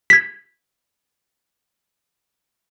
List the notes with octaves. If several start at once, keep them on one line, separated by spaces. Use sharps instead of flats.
G#6 B6